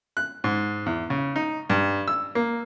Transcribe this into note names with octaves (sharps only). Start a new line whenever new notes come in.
F#6
G#2
E2
C#3
D#4
G2
E6
A#3